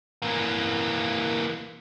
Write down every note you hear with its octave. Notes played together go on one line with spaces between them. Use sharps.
E3 A#3